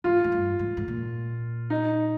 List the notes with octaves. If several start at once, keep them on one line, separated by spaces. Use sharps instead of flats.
G#2 F4
G#2
G2
G#2
G#2
A#2
D#4